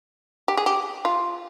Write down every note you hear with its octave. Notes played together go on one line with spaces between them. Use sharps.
G4
G#4
G4
F4